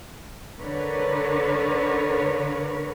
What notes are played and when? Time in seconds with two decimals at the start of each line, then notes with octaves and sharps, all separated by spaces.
0.60 D3 A#4 B4 C#5